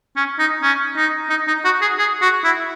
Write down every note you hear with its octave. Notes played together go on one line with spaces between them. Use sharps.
C#4
D#4
C#4
D#4
D#4
D#4
F#4
G#4
G#4
F#4
E4